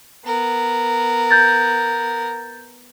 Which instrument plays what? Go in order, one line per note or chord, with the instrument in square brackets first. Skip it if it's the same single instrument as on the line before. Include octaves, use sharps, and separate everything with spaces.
[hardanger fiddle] B3 A#4
[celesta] G6 A6